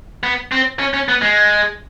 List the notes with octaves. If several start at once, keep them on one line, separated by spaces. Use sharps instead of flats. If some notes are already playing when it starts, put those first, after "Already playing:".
B3
C4
C#4
C#4
B3
G#3